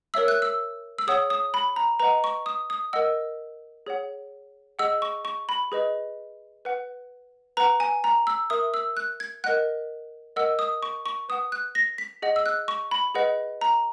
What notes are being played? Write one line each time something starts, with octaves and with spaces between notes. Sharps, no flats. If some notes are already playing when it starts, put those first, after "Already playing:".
A#4 C#5 E5 E6
F#6
E6
E6
G#4 C#5 F#5 D#6
D#6
B5
A#5
B4 D#5 F#5 A#5
C#6
D#6
D#6
A#4 D#5 F#5 E6
G#4 C#5 F#5
G#4 D#5 F#5 E6
C#6
C#6
B5
G#4 B4 D#5
B4 F#5
B4 F#5 A#5
G#5
A#5
E6
A#4 E5 D#6
E6
F#6
G#6
A#4 D#5 F#5 F#6
A#4 D#5 F#5 E6
D#6
C#6
C#6
B4 F#5 D#6
F#6
A#6
B6
G#4 D#5 F#5
E6
F#6
C#6
B5
G#4 B4 D#5 F#5
A#5